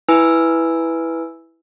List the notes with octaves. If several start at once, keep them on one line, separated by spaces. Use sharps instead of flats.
E4 B4 G#5 E6